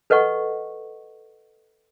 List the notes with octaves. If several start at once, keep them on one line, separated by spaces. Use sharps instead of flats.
A4 B4 D#5 F#5 C#6